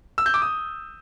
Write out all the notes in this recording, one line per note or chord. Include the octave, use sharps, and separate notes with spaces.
E6
G6
D6
D#6